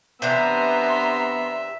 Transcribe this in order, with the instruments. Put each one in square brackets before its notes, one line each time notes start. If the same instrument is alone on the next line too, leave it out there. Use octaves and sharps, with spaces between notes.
[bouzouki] C3 E3 D4 [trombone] B3 [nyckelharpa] E5 [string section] A#5 C6